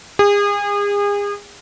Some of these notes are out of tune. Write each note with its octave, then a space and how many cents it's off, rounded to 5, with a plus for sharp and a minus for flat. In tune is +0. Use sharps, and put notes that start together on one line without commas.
G#4 -35